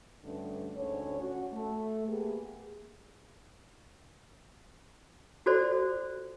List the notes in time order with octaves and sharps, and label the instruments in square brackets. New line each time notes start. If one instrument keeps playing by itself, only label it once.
[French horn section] G2 B2 D3 G3 A3 C#4
D2 G#2 D3 C#4 C#5
C#4 F#4
A3
A#3 B3 G4 G#4
[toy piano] F4 F#4 A4 C5 D5